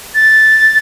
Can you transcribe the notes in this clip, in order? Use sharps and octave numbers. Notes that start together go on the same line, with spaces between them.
A6